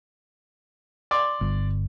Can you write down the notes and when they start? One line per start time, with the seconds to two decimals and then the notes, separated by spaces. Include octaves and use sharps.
1.11 D5 C6 D6
1.41 G1